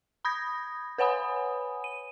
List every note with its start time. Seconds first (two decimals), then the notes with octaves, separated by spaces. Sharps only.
0.25 B5 D#6 G6 G#6 A#6
0.98 B4 C#5 F#5 G#5 B5 D#6
1.84 D#7